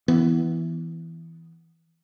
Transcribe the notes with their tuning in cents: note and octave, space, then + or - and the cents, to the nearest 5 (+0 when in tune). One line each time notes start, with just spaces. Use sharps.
E3 +0 B3 +0